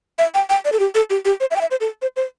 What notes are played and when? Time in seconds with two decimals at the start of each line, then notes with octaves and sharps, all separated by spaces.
0.19 E5
0.34 G5
0.50 G5
0.65 D5
0.72 A4
0.79 G4
0.95 A4
1.10 G4
1.25 G4
1.40 C5
1.51 E5
1.56 G5
1.61 E5
1.71 C5
1.80 A4
2.02 C5
2.16 C5